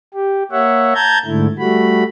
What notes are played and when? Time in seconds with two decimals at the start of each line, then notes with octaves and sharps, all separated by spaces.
0.14 G4
0.52 A#3 C#5 E5 F#5
0.94 A5 A#5 G6 G#6
1.25 G#2 D3 A3 E4
1.58 G3 A3 F#4 B5